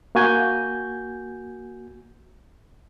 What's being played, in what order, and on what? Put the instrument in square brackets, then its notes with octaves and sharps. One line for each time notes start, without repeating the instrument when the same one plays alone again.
[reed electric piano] A#3 F#4 G#5 G6 G#6